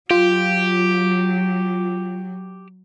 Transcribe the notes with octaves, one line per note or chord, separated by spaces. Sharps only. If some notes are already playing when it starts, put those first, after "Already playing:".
F#3 F4 G4